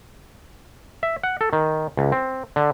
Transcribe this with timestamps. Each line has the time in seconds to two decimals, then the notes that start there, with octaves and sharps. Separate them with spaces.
1.03 E5
1.24 F#5
1.41 A4
1.53 D#3
1.97 C#2
2.12 C4
2.56 D3